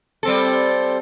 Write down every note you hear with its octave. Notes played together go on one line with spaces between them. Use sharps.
G3 C4 A4